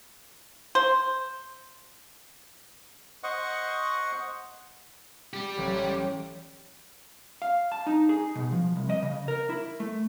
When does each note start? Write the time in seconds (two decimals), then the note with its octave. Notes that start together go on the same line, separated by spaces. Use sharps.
0.75 C5
3.23 C5 D#5 F#5 C#6
5.33 G3 G4
5.57 A1 F#3
7.42 F5
7.72 A5
7.87 D#4
8.09 G#4
8.35 B2
8.52 F3
8.76 C2
8.90 D#5
9.02 C#3
9.28 A#4
9.50 E4
9.80 A3